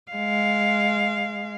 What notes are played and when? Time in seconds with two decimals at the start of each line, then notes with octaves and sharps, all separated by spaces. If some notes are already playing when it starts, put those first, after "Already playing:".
0.12 G#3 F5